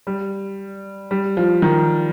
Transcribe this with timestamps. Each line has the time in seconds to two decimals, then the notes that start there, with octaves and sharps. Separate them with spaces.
0.07 G3
1.11 G3
1.37 F3
1.62 D#3